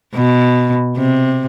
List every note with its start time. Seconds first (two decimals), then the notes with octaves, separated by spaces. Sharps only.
0.15 B2
0.97 C3